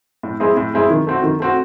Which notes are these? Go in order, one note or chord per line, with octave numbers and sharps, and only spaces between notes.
A2
G#3 C4 E4 G#4
A2
G#3 C4 E4 G#4
D#3
A3 C4 F#4
D#3
A3 C4 F#4